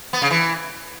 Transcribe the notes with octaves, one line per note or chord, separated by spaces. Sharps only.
B3
C#3
E3